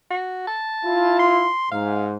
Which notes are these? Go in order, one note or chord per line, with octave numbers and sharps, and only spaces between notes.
F#4
A5
E4 F4
C6
G#2 F5